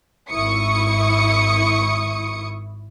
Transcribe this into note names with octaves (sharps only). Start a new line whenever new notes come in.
G#1 E4 C#6 D#6 C#7